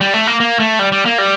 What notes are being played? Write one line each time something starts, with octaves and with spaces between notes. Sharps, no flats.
G3
A3
A#3
A#3
A3
G3
G3
A#3
G3